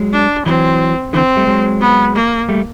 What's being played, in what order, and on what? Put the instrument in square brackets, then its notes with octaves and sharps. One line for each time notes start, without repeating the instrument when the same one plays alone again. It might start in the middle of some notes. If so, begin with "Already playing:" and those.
Already playing: [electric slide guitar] F#3 G#3
[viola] D4
[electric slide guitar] E3 F#3 [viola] C4
[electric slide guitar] D3 E3 [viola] C4
[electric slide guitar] G3 A3
F#3 G#3
[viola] B3
A#3
[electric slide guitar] G3 A3